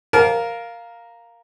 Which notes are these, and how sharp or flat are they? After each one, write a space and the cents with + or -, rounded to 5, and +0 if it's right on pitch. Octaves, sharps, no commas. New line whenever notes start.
A#4 +0 F5 +0 A5 -40